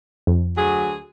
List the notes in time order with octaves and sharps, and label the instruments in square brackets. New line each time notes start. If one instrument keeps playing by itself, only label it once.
[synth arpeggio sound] F2
[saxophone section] D2 F#3 G#4